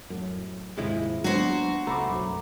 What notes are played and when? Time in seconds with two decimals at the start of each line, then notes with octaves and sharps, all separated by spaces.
0.10 F#2 A2
0.78 D#2 G#2 C3 F3 G#3 E4
1.24 F#3 G#3 A#3 B3 D4 F#4 C5
1.87 C#2 A3 A#5 B5 D6
2.06 F#1 B1 F#2